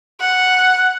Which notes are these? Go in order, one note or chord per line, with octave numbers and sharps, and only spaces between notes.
F#5